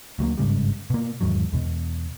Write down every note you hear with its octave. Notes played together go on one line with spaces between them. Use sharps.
D2 F#3 G#3 A#3
G1 G#2 C#3 G3
B2 A#3
E2 G#2 D#3 F#3
E2 B2